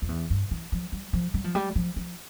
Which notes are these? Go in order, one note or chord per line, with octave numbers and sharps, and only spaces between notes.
F2
E2
G2
E3
F3
G3
F3
G3
F3
G3
F3
F3